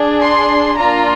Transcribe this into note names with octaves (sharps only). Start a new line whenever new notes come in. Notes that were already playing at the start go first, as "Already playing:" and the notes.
Already playing: D4 G#4
C6
A#3 D4 F4 A#5